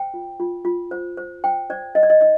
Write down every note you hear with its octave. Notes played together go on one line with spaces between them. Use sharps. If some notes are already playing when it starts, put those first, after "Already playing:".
Already playing: C5 G5
F4
F4
F4
C5
C5
C5 G5
C5 D5
C5 D#5
D5
D#5
D#4 D#5